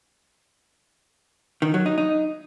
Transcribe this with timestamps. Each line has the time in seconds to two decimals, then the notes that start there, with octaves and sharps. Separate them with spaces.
1.62 D#3
1.74 F#3
1.86 D#4
1.98 D#4